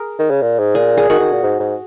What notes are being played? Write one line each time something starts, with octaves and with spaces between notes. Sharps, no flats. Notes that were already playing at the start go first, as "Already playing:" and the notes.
Already playing: G#4 A#4
D#3
C#3
A#2
G#2
A#2 G#4
G#4
D#3 F#4
D#3
A#2
G#2
G#2